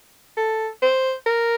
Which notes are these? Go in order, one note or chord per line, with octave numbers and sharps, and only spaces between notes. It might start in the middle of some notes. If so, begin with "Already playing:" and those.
A4
C5
A#4